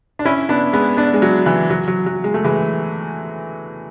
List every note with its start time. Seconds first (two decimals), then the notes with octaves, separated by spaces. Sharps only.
0.19 D4
0.25 C#4 E4
0.49 B3 D4
0.73 G#3 B3
0.97 B3 D4
1.14 G#3
1.22 F#3
1.46 E3
1.70 F#3
1.88 F#3
2.06 F#3
2.24 G#3
2.34 A3
2.44 E3 G#3